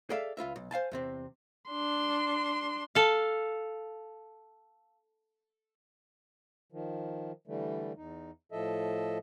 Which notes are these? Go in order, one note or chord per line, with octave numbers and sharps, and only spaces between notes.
G#4 A4 D5 E5 F5
C#2 F4 B4 E5
B1
C5 F5 G#5 A5
E2 C3 C4
D4 C6
A4 F5
D#3 F3
D3 E3 G3 A3
E2 D#4
A2 F3 A4 D#5 E5